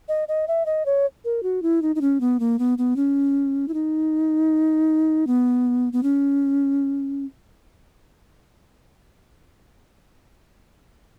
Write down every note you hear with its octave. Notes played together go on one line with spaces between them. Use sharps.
D#5
D#5
E5
D#5
C#5
A#4
F#4
E4
D#4
D#4
C#4
B3
A#3
B3
B3
C#4
E4
D#4
B3
B3
C#4